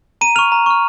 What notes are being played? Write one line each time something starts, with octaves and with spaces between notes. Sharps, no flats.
A#5 D#7
C#6 F6 F7
A#5
C#6 F6